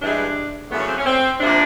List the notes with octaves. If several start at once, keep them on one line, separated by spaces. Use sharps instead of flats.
G2 E3 G#3 D4
F#2 C#3 E3 A3 B3
C#4
C4
C#4
C4
D2 C3 F3 A#3 D4